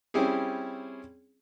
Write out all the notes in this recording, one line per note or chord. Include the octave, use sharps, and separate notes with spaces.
G3 C4 C#4 E4 G4 G#4